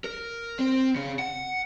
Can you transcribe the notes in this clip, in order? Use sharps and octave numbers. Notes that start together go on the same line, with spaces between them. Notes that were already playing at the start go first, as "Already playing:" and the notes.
A#4
C4
C#3
F#5